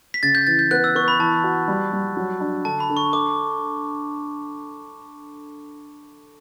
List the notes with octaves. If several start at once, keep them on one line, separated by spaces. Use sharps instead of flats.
B6
C#3 A6
G6
E3 A6
G6
B3 F#6
E6
B3 C#6
B5
E3 A5
F#4
G3
G3
F#3
D4
D3 A5
B5
D3
C#6
A4 D6